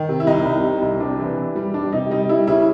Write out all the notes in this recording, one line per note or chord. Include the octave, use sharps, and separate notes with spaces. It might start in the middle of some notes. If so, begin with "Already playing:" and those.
Already playing: D#3
C3
E4
C2 D#4
C2
C3
C2
C3 D4
E3
E3
G3
G3 D4
C3 D#4
G3 D#4
G3 E4
C#3 E4